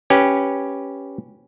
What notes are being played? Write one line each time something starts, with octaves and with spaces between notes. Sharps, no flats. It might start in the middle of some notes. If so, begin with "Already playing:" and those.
C#4 G4 B4